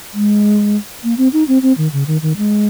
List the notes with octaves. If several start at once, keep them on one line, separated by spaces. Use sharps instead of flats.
G#3
A#3
C4
D#4
C4
C4
D#3
C#3
D#3
D#3
G#3